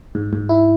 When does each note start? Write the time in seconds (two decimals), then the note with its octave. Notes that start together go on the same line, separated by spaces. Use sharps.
0.15 G#2
0.33 G#2
0.49 E4